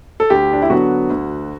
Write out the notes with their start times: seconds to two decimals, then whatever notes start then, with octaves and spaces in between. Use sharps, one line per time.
0.20 A4
0.30 D2 G4
0.53 D4
0.62 E4
0.70 D3 F#3 B3 F#4
1.10 D2